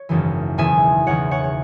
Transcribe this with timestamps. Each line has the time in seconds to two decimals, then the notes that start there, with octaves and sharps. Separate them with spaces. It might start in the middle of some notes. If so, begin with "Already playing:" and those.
Already playing: C#5
0.09 G#1 F#2 C#3 E3
0.58 E1 E2 C#3 E3 E5 G#5
1.07 E1 E2 C#3 E3 C#5 F#5
1.31 C#5 F#5
1.44 C#5